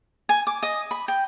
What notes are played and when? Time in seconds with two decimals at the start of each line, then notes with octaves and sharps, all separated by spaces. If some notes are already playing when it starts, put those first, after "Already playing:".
0.29 G#5
0.47 D6
0.63 D#5
0.91 B5
1.08 G5